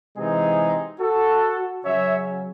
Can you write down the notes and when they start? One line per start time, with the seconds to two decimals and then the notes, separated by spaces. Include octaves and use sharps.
0.16 C3 E3 G#3 C4 D#4 G#4
1.00 F#4 A4
1.84 C#3 F#3 C#4 C#5 E5